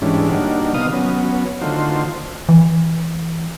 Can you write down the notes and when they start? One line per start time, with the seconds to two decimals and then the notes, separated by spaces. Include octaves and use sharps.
0.02 G#2 E3 G3 C#4 D4
0.31 D#3 G3 A#3 D4 F#4
0.74 C3 D#3 B3 F5 D#6
0.93 F#3 B3 C#4
1.61 D3 D#3 A3 F4 F#4 C5
2.49 E3